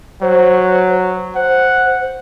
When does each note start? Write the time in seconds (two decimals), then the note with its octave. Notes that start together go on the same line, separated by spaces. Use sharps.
0.22 F#3 C5
1.36 C5 F#5